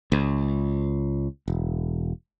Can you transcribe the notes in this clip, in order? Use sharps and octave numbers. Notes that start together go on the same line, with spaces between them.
C#2
E1